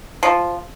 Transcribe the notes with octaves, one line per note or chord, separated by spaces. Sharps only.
F3